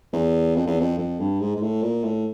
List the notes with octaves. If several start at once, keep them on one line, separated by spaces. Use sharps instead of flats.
E2
F2
E2
F2
F2
G2
G#2
G#2
A2
A#2
A2